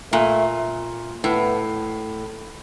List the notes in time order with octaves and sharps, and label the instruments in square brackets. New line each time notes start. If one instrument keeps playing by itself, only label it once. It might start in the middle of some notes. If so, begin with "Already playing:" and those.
[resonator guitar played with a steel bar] A#2 [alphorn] A3
[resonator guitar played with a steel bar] A2 [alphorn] B3